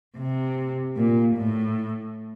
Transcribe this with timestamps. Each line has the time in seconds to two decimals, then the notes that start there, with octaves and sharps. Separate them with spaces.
0.17 C3
0.96 A#2
1.35 A2